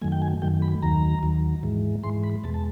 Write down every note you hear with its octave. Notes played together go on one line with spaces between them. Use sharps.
F#2 D#3 F#3 A3 G#5
G5
G#5
F#2 D#3 F#3 A3 G5
B5
D#2 D#3 F#3 A#5
D#2 D#3 F#3
G#2 E3 G#3
G#2 E3 G#3 C6
B5
E2 B2 G#3 A5
A5